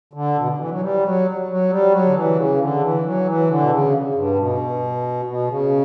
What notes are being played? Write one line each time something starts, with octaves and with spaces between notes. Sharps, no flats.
D3
B2
E3
F#3
G3
F#3
F#3
G3
F#3
D3
E3
C#3
D3
E3
F#3
E3
D3
B2
C#3
G2
B2
B2
C#3